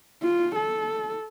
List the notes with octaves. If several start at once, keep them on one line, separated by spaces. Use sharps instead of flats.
F4
A4